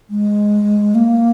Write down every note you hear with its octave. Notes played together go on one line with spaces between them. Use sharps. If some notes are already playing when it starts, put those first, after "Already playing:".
G#3
A#3